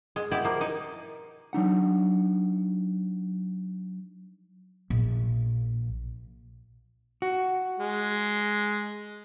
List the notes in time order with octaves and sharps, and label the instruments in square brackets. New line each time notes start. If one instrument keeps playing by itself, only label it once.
[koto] G#3
B2 E4 G4 D5
F3 A#3
D#4
[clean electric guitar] F#3 D4 D#4 F#5
[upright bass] A#1
[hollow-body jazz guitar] F#4
[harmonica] G#3